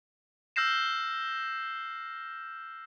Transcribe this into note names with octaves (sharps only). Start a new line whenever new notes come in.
E6 F6 G6 A#6 C7 E7